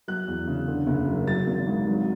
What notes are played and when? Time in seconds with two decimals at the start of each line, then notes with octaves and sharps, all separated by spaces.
0.08 F#3 F#6
0.27 E2
0.48 C#3
0.68 D3
0.87 F#1
1.07 F#2
1.27 F#3 A6
1.47 G#1
1.67 G#2
1.87 F#3